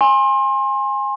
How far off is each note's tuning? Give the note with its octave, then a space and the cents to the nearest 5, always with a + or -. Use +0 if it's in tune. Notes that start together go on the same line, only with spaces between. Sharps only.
G#5 -15 C6 +30